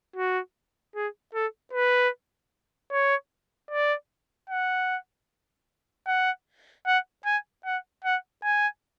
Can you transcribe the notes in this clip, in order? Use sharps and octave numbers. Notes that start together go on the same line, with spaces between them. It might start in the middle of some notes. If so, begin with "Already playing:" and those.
F#4
G#4
A4
B4
C#5
D5
F#5
F#5
F#5
G#5
F#5
F#5
G#5